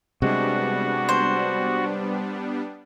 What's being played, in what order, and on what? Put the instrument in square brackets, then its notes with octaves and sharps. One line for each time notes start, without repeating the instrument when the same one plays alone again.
[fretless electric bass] C3 G#3 [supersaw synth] G3 B3 D4 [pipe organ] F#4
[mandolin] C5